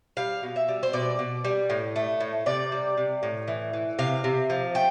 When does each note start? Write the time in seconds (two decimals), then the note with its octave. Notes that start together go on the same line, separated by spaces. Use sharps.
0.17 G3 F5
0.43 B2
0.56 E5
0.68 G3
0.83 C5
0.93 B2 D5
1.19 B2
1.44 G3
1.70 A2
1.96 A3
2.20 A2
2.46 C3 D5
2.72 G3
2.97 C3
3.23 A2
3.48 E3
3.73 E3
3.99 C3 F5
4.24 C3
4.50 F3
4.74 A3 G5